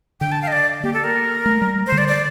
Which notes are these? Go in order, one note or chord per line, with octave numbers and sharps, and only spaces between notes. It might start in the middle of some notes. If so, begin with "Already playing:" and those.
D3 G5
A5
F5
D#5
D5
A#3 G4
A4
A#4
A3
G3
C5
D3
D5
D5